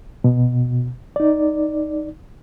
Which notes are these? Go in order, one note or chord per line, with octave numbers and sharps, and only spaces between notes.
B2
D#4 D5